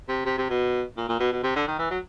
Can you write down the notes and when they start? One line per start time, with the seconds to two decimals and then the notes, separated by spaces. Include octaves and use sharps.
0.09 C3
0.26 C3
0.38 C3
0.50 B2
0.97 A#2
1.09 A#2
1.20 B2
1.32 B2
1.43 C3
1.56 D3
1.67 D#3
1.79 E3
1.90 F#3